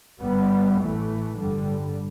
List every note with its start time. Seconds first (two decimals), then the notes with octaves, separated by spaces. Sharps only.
0.20 G1 G2 G3 B3
0.80 A1 A2 E3 A3
1.39 G1 G2 D3 G3